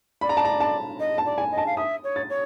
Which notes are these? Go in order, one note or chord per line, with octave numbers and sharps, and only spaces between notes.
D5 B5
A#5
A5
A#5
A5
D#5
A5
D5
G#5
D#5
A5
F5
E5 D#6
C#5
A6
C#5